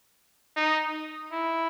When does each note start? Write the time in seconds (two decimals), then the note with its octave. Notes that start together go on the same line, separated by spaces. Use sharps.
0.56 D#4
1.32 E4